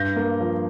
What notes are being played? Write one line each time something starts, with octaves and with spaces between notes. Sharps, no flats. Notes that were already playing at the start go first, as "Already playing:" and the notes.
Already playing: G2 G6 A#6
A#3
F3